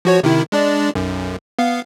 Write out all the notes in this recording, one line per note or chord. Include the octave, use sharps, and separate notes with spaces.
F3 F#4 C#5
C3 D#3 E4
G#3 D4 D5
B1 F#2
B3 F5